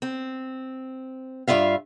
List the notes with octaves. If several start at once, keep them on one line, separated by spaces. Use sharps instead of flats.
C4
G2 F4 E5 F5